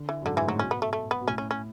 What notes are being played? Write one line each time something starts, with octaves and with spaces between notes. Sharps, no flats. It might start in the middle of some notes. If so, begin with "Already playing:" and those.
Already playing: D3
E3
F#2
G#2 D3
G#2 E3
A2 F#3
B2 C#4
B3
A3
A3
B3
B2
A2 C#4
C#4
C#4